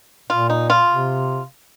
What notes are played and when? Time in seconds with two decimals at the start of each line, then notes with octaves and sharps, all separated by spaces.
0.30 A#2 F4
0.50 D#4
0.70 F4
0.90 C3